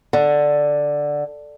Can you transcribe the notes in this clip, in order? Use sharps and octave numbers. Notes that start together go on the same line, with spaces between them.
D3